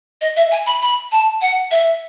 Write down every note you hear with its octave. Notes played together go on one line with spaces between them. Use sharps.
D#5
E5
G#5
B5
B5
A5
F#5
E5